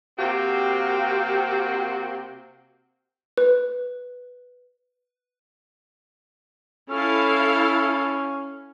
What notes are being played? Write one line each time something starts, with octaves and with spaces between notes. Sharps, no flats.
C3 A#3 C4 F#4 G4
B4
C#4 E4 A4 F5